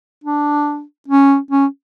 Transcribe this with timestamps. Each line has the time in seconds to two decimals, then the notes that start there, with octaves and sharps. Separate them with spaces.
0.24 D4
1.08 C#4
1.51 C#4